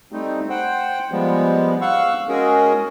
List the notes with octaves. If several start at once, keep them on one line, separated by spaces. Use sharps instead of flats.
G3 A3 C4 D#4
C5 F#5 G5
F3 G3 G#3 B3
F5 F#5 C#6 E6
G#3 C#4 F#4 G#4 A#4